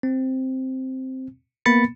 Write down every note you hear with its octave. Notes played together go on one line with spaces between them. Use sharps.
C4
A#3 B3 B5 A6 C#7